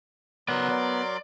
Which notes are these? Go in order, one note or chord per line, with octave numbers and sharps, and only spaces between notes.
C#3 F#3 B3 A#4 D5 C6
D5